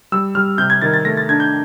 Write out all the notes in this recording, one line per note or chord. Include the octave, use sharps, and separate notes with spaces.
G3 E6
G3 F6
C3 G6
G#6
D#3 A6
A6
A3 A#6
A6
D4 G#6
G6